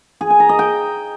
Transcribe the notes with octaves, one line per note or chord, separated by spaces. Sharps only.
G#4
G#5
A#5
D#5
G5